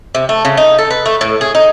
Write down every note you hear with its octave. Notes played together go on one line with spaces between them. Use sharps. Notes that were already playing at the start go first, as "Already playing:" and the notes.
C3
A3
C#3
D#4
A4
B4
A3
A2
G#4
D#4